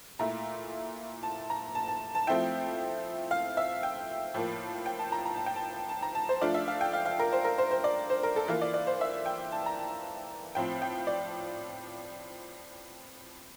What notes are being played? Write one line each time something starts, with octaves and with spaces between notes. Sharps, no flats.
A#2 A3 E4 A#5
A5
A#5
A5
A5
A5
F3 A3 C4 E4 G5
F5
E5
G5
A2 F3 A#3
G5
A5
A#5
A#5
A5
G5
A5
A5
A#5
A5
C5
F3 A3 D4 F4 D5
E5
F5
G5
F5
F5
A#4
C5
A#4
C5
C5
D5
C5
A#4
A4
E3 A#3 F4
D5
D5
C5
E5
G5
A5
A#5
A5
A2 F3 C4 G5
G5
D5